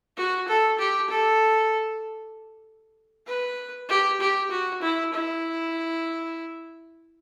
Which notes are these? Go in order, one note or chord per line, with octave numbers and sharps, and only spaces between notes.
F#4
A4
G4
A4
B4
G4
G4
F#4
E4
E4